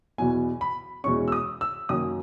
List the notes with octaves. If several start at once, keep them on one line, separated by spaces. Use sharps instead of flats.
E2 B2 F#3 B3 G#5
B5
E2 B2 G#3 C#4 C#6
E6
D#6
E6
F#2 D#3 A#3 C#4 D#6